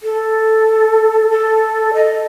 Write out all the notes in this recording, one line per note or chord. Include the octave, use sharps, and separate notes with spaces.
A4
A4
D#5